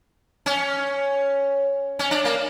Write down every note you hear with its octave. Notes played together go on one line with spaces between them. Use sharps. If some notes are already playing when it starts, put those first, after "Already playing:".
C#4
C#4
D4
A#3